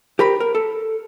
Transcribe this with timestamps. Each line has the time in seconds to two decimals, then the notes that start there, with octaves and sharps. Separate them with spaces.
0.19 G4 A#4 C5 B5
0.40 A#4
0.55 A4